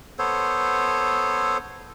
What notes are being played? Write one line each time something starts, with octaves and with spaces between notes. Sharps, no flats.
B3 A4 C5 C#5